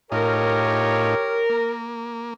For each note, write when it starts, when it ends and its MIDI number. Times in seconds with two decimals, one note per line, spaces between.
0.12 1.15 45
0.12 1.15 63
0.12 1.15 65
0.12 1.50 67
0.12 1.85 70
0.12 1.50 73
1.50 2.34 58